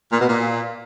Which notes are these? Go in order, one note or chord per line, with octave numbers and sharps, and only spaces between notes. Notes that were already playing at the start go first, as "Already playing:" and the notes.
A#2
B2
A#2